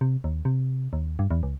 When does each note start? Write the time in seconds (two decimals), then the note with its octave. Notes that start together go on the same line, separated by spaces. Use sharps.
0.01 C3
0.24 D#2
0.45 C3
0.93 D#2
1.19 G2
1.31 E2
1.43 C#2